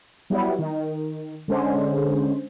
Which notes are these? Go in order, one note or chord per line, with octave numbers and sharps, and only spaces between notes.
F#3 G3 B3 E4
D#3
D3 G#3 C#4 C5